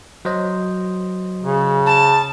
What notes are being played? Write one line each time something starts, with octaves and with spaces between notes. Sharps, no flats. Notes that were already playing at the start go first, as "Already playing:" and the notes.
F#3 C5 D#5
C#3
A5